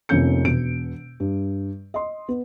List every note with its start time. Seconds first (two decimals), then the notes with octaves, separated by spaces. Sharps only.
0.09 F1 F2 A#3 C#4 G6 C#7
0.45 E1 B2 D7
1.20 G2
1.94 D#5 C6
2.29 B3